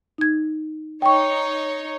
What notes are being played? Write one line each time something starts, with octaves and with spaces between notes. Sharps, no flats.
D#4 G#6
D#4 C#5 G5 C#6